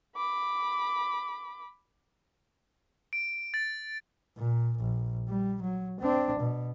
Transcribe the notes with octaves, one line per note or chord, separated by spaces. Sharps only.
B5 D6
D7
A6
A#2
A#1
G3
F#3
C4 D4
B2